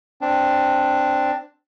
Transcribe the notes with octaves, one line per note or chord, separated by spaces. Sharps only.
C4 D4